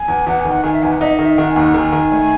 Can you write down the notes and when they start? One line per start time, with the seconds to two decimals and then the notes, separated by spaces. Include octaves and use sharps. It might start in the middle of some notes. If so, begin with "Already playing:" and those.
Already playing: G#5
0.08 E2
0.27 E2 F#5
0.40 G#5
0.45 D#3
0.52 F#5
0.64 D#3 G#5
0.73 E5
0.83 E2 G#5
0.92 F#5
1.01 D#4 E5
1.13 D#5
1.19 D#3
1.26 E5
1.38 D#3 F#5
1.50 G#5
1.56 D#2
1.62 F#5
1.74 D#3 A#5
1.78 G#5
1.92 D#3
2.12 A3